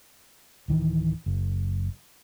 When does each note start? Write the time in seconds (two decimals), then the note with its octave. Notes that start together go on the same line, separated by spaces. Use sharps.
0.68 D1 D#3 E3
1.26 F#1